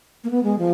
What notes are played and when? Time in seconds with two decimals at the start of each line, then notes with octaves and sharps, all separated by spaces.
0.24 A#3
0.30 B3
0.43 G#3
0.59 F3